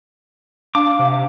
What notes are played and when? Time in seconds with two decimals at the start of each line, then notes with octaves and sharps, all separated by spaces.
0.75 D4 F5 D6
0.99 C3